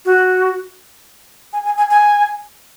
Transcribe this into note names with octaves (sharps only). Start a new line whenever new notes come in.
F#4
G#5
G#5
G#5
G#5